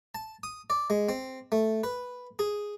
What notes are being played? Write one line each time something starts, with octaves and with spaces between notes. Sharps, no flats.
A5
D#6
D5
G#3
C4
A3
B4
G#4